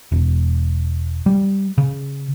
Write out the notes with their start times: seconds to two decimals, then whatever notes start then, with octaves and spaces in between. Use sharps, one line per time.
0.12 E1
1.26 G3
1.78 C#3